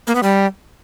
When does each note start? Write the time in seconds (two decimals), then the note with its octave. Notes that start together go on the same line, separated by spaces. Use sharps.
0.07 A#3
0.15 B3
0.23 G3